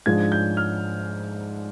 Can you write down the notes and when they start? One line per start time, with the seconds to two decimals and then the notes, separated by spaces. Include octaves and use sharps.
0.06 G#2 F3 G#3 D4 G#6
0.32 G6
0.57 F6